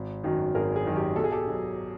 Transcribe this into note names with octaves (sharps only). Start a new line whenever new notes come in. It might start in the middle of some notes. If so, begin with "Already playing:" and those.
Already playing: G#1
F#2 D#3 F#3
G#1 G#4 A#4
G#4
F#2 D#3 F#3
G4
B1 A4
G#4
G4 A4
B2 F#3